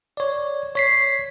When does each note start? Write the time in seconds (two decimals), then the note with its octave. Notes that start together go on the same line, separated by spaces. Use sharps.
0.17 C#5 D5
0.75 C#5 B6 C7